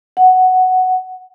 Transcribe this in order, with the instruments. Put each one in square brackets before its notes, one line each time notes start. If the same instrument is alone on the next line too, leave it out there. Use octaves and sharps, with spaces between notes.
[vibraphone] F#5